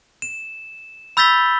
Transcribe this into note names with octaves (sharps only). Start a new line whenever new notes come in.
E7
B5 E6 G6 A6 B6 G7